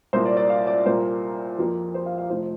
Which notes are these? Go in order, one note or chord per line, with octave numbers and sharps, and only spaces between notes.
C2 A#2 A#3 C5
D5
D5
F5
D5
C2 A#2 A#3 C5
F2 F3 A#3
C5
F5
F5
F1 F2 F3 C5